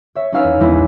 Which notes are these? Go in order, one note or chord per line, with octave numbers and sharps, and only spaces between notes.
C#5 E5
C#4 D#4 G#4 B4 F5 E6
E2
E2 E3 G#3 B3 C#4 E4
A#1